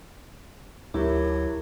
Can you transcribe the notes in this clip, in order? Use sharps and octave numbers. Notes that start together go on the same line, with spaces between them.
D2 F#3 E4 G4 A#4 E5